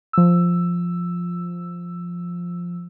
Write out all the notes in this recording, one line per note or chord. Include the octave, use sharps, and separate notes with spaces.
F3 E6